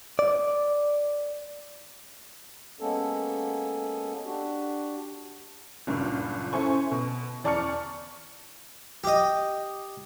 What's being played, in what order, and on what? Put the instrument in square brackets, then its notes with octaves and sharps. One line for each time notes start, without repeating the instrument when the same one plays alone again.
[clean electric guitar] D5
[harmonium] G#3 A#3 B3 C#4 A4
D4 F#4 G4
[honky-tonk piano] F#1 C#2 G2 A#2 C#4 F6
C#4 E4 A4 C5 G#5 C#6
B2
E2 D5 A5 C#6 F6 C#7
[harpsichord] G4 D#5